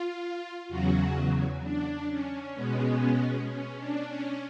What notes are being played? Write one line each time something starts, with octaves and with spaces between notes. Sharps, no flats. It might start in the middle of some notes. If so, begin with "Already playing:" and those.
Already playing: F4
E2 C#3 F#3 F#4
D4
C#4
B2 G#3 B3
C#4
D4
C#4